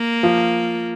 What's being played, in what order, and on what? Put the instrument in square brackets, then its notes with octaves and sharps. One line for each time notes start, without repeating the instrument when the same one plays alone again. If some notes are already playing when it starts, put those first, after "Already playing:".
Already playing: [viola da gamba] A#3
[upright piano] F3